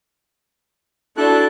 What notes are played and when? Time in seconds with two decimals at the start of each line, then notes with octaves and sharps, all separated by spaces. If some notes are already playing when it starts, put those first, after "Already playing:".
1.17 D4 E4 F#4 A4 F#6